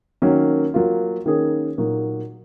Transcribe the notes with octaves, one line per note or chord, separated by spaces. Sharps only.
D#3 F#3 A#3 C#4
F#3 A#3 F4
D#3 A#3 C#4 G#4
A#2 F#3 A#3 D#4 F#4